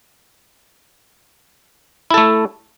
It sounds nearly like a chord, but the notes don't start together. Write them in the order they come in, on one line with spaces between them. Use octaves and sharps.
E4 A4 A3